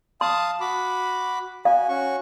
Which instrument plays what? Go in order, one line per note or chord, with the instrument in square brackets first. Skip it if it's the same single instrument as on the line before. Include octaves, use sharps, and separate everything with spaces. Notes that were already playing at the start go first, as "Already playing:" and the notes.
[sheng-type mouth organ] F5 A5 D#6 [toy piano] C6
[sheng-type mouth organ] F#4 B5 D6
[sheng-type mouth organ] F#4 G#5 [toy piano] F5
[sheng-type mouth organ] C#4 F#4 C#6